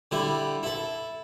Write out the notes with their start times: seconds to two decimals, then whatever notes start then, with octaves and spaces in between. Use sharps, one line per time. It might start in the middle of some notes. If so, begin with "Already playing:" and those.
0.11 D3 G3 E4
0.63 E4 A4